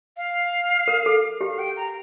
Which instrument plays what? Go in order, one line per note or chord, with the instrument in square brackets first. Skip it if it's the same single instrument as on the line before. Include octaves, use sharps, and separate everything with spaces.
[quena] F5
[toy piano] A#4
A4
G4
[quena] F5
G5
A#5